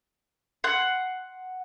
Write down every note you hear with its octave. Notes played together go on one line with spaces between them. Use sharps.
F#5 C6